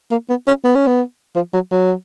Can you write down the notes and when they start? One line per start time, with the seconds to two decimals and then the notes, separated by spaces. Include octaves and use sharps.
0.11 A#3
0.29 B3
0.47 C#4
0.64 B3
0.75 C#4
0.87 B3
1.35 F3
1.54 F#3
1.71 F#3